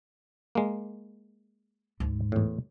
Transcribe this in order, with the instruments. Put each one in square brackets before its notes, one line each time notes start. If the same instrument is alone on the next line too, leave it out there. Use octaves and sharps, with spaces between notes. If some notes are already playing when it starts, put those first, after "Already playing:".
[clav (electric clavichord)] G#3 A#3
[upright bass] D2 G#2
[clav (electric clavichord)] E2 A2